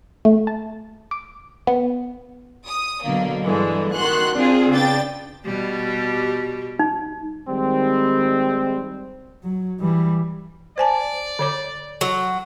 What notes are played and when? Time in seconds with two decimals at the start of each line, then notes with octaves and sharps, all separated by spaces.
0.25 A3
0.47 A5
1.11 D6
1.67 B3
2.67 D#6
3.04 B2 D3 F#3 A#3
3.45 G2 D3 E3 G#3
3.95 D#3 F#4 C6 F#6
4.36 C4 D4 F4 G#4
4.70 C#3 B3 D4 G5 A6
5.46 B2 G3 G4
6.79 D#4
7.49 D#3 G3 G#3 C4
9.44 F#3
9.80 E3 G3
10.78 C5 D5 G#5 A5
11.39 D3 C#5 D6
12.01 F#3